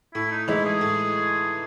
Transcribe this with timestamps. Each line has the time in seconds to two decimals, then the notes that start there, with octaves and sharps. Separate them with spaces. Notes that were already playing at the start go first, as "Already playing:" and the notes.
0.15 A2 E4
0.31 D#4
0.48 E3 G#3 D#4 E4
0.65 G#4
0.81 A2